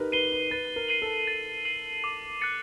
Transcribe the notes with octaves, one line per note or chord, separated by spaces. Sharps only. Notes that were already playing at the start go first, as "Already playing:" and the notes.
Already playing: D#4 G4 A#4 B4
B4 C7 D#7 G7
B4
B4 A6
A#4
C7 D#7 F#7
A4
A6
C7 D#7 F#7
D6
F#6 A6 C#7